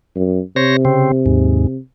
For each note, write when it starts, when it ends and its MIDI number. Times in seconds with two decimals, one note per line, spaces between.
0.16 0.40 42
0.56 1.77 48
0.56 0.76 72
0.56 0.76 73
0.56 0.76 94
0.85 1.11 49
0.85 1.11 60
1.26 1.67 39
1.26 1.67 44